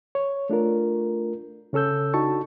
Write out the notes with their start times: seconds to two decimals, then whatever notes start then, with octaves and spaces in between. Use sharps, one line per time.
0.15 C#5
0.50 A3 D4 F4 A#4
1.73 C#3 C#4 A4 E6 G6
2.14 D4 D#4 F#4 A5 C#6